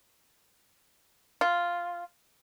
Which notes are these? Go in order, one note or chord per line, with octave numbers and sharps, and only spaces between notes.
F4